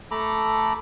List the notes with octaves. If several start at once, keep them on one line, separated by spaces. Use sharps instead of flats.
A3 A4 A#5 B5 D6